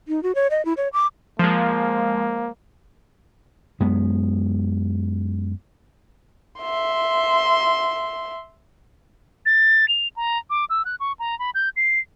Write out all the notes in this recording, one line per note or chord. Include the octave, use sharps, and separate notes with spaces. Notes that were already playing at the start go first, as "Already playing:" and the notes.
D#4
F#4
C#5
D#5
E4
C#5
D6
F3 G#3 A#3
F#2 G#3 B3
E5 C6
A6
F7
A#5
D6
E6
F#6
C#6
A#5
B5
G6
C7